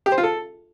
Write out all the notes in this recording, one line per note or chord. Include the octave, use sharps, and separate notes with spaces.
G4
C5
F4
A4